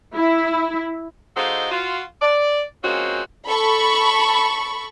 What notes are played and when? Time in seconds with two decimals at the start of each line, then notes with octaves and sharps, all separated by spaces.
0.15 E4
1.36 G#3 D#4 F4 F#4 A4 C5
1.70 F4 F#4
2.21 D5
2.83 F3 G#3 A#3 C4 C#4 F#4
3.46 A4 B5 C#6